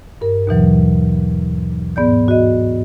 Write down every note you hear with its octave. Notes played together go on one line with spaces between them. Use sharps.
G2 A#4
D#2 B2 E3 F#3
G#2 B3 D5 G6
F#4 D#5